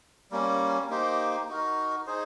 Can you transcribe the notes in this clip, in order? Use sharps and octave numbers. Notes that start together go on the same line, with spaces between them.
G3 A#3 C#4
A#3 D#4 G4 C5
D#4 F#4 A#4
D#4 G#4 C5